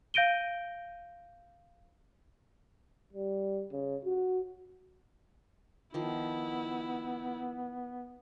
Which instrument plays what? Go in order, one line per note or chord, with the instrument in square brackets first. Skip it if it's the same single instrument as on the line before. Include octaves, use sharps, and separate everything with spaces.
[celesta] F5 G6 A#6 D7 D#7 G7
[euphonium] G3
C#3
F#4
[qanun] D#3 F3 [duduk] B3 [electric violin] E4